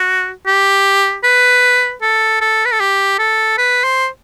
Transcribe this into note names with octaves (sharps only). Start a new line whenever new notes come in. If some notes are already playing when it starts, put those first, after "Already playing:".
Already playing: F#4
G4
B4
A4
A4
B4
A4
G4
A4
B4
C5